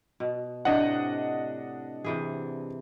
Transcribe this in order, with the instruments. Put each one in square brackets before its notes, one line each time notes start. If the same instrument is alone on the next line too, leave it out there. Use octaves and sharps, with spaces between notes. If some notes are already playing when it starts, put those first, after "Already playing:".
[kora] B2
[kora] A2 C3 [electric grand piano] D4 D#5 F#5
[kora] C3 E3 G#4